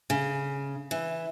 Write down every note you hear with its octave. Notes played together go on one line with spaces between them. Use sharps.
C#3
E3